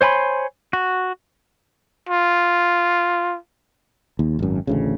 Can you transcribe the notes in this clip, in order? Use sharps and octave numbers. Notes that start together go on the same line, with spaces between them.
C5 C#5 G#5 B5 C6
F#4
F4
D#2
G#1 F#2
A1 D2 C#3